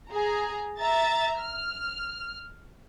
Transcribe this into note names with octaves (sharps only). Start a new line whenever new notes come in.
G#4 A#5
E5 A#5 A6
F6